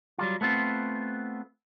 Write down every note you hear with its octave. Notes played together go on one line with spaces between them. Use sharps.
F#3 G3 F4
A3 B3 C4 F4